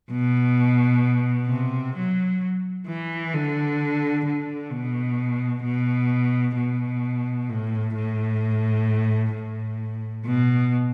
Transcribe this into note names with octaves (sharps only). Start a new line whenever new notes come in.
B2
C3
F#3
E3
D3
D3
B2
B2
B2
A2
A2
A2
B2